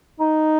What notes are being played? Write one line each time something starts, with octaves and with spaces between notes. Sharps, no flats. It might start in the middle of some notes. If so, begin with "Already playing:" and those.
D#4